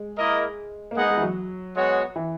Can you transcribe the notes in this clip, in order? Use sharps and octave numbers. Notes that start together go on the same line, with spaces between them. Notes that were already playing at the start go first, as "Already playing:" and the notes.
Already playing: G#3
A#3 E4 A#4 D#5
A#3
G#3 B3 D#4 G#4 D#5 F#5
G#3
E3
F#3
G#3 B3 F#4 C#5 F#5
E3